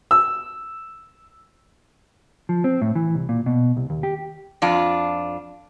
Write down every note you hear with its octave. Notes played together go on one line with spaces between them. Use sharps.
E6
F3
C4
A2
E3
C2
A#2
B2
C2
D#2
G4
F2 D4 F4